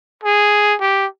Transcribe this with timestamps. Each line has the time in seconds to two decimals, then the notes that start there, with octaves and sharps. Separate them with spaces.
0.23 G#4
0.81 G4